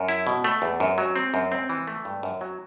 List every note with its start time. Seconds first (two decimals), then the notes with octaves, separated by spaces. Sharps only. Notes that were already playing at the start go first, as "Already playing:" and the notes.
Already playing: F#2
0.09 E4
0.27 B2
0.44 A3
0.62 E2
0.80 F#2
0.98 F#3
1.16 C4
1.34 F#2
1.52 C4
1.69 E3
1.87 A3
2.05 G2
2.23 F#2
2.41 F#3